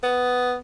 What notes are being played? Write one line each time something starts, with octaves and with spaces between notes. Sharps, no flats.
B3